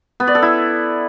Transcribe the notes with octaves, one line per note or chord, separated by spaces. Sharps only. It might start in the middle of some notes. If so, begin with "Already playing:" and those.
B3
D5
A4
E4